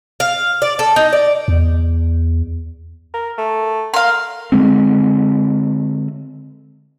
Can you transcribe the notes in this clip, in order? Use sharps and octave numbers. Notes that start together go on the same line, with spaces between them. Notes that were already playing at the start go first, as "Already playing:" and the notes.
F5
D5
A4
D#4
D5
E2
A#4
A3
A#4 F5 C6
D3 D#3 G#3 C4